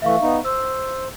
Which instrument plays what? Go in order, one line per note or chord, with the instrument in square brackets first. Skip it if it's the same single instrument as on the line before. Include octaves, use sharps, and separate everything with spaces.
[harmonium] E3 A3 [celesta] E5 F5 C#6
[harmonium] B3 D#4
[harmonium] C5 [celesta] E6